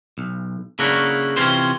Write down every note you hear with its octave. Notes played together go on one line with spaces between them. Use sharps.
B1
C#3 A#3 D4 E4 F#4
C3 E3 C4 C#4 F4 C5